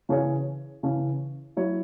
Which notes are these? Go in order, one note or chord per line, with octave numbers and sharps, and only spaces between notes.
C#3 E3 C#4 G#4 C#5
C#3 E3 C#4
F#3 E4 C#5